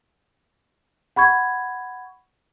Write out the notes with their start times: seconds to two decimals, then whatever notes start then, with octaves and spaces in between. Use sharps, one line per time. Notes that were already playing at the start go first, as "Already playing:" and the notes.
1.16 F#5 B5 C#6 G#6